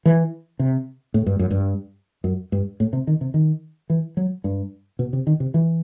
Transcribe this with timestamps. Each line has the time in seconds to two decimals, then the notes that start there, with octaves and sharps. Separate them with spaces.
0.05 E3
0.59 C3
1.14 A2
1.26 G2
1.39 F#2
1.51 G2
2.24 F#2
2.52 G2
2.80 A2
2.93 C3
3.07 D#3
3.21 C3
3.34 D#3
3.90 E3
4.17 F#3
4.44 G2
4.99 B2
5.13 C3
5.27 D#3
5.40 C3
5.54 E3